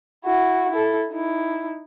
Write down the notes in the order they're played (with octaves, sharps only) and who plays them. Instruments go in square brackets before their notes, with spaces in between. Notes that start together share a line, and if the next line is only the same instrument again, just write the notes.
[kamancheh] E4 F#4
E4 A4
D#4 E4